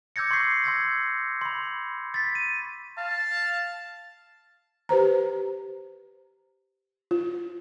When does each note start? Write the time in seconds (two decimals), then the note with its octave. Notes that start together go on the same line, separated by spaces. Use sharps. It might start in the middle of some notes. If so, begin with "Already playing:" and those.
0.16 D6 E6 G6 G#6 A#6 C#7
0.31 C6 C#6 E6 C7
0.64 C6 E6 G#6 A#6
1.41 B5 C6
2.14 A6 B6
2.35 D#7
2.98 F5 A5
4.89 G4 B4 C5 A#5
7.11 F4